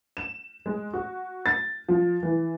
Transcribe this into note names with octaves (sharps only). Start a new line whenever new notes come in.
E7
G#3
F#4
A6
F3
E3